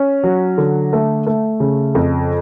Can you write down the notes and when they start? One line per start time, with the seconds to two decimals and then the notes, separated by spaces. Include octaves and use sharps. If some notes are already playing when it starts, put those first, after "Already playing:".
Already playing: C#4
0.23 F#3
0.58 D3
0.93 A3
1.27 A3
1.60 C#3
1.95 F2